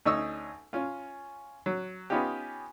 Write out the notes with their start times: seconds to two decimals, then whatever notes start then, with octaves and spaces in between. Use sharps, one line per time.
0.05 D2 C#4 D#4 G#5 C#6 E6
0.73 C#4 F4
1.66 F#3
2.10 B3 C#4 D#4 F4 G4